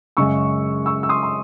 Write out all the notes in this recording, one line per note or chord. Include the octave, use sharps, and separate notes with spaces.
F#2 C#3 G#3 C#6 E6
C#6 E6
E6
C6 D#6
C6